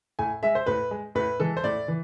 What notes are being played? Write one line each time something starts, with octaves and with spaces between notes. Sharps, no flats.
A2 G#5
G#3 E5
C5
A2 B4
G#3
A2 B4
E3 G#3 A4
C5
A2 D5
E3